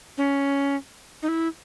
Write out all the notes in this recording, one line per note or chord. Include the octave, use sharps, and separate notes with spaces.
C#4
D#4
E4